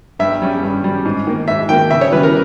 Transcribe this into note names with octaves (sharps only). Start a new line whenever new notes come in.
G2 E5
G3 C#4
G2
G3 C#4
G#2
D#3 A#3
G#2 E5
D#3 A#3 G5
C#3 E5
C#5
E3 G3 C#4 B4
A#4